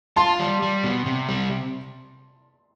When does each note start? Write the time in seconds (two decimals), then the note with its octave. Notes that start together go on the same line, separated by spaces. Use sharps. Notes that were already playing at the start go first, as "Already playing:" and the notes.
0.16 F4 A5 C6
0.39 G3
0.62 G3
0.84 B2
1.06 C3
1.29 G3